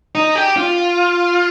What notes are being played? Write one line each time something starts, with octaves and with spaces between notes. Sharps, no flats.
D#4
G4
F4